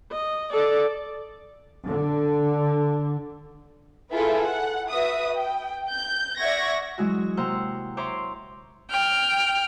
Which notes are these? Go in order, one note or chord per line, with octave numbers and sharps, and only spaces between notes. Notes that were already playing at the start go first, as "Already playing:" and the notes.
D#5
A4 D5
D3
E4 F4 G#4 A4 B4 E5
F#5
F#4 B4 E5 D#6
G5
G6
D5 E5 F#5 C#6 G#6 A#6
E3 F#3 G#3 E4 F#4
C3 A#3 C5 F#5 A#5 E6
C5 C#5 E5 A#5 C6 D6
G5 F6